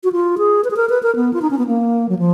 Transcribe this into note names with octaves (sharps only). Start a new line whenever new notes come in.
F#4
F4
G#4
B4
G#4
A#4
B4
A#4
B3
F4
D#4
C#4
B3
A#3
F#3
F3